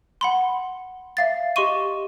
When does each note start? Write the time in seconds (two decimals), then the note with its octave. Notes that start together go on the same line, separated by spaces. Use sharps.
0.21 F#5 B5 C6
1.17 E5 F5 A6
1.56 G4 D#5 C6 C#6 D#7